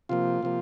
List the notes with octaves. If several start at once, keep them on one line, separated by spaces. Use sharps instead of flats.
C3 F3 A#3 F4
C3 F3 A#3